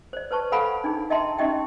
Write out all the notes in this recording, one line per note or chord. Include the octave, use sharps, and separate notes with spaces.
C5 D5
B4 C5 A5 C#6
A4 C5 F5 F#5 G#5 B5
D4 D#4 G#4
D#5 E5 G5 A5 A#5 C6
C#4 D#4 G4 D#5 E5 G5